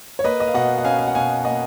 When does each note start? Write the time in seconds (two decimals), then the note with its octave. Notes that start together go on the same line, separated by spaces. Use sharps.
0.19 C#5
0.24 A#3 B4 D#5
0.40 D#5
0.47 F5
0.54 B2 D#5 F#5
0.78 F#5
0.84 C#4 F5 G#5
0.99 F5
1.07 F#5
1.15 B2 F5 G#5
1.45 A#3 D#5 F#5